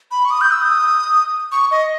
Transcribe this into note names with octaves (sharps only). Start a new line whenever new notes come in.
B5
C#6
D#6
G6
E6
D#6
C#6
D#5